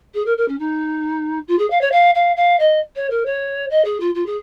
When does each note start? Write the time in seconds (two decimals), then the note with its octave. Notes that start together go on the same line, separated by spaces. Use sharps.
0.14 G#4
0.25 A#4
0.37 A#4
0.48 C#4
0.59 D#4
1.47 F4
1.58 G#4
1.70 F5
1.81 C#5
1.91 F5
2.14 F5
2.36 F5
2.59 D#5
2.96 C#5
3.10 A#4
3.25 C#5
3.70 D#5
3.84 G#4
4.00 F4
4.14 F4
4.26 G#4